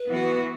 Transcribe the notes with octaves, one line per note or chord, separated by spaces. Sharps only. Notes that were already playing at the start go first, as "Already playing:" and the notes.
Already playing: B4
E3 B3 F#4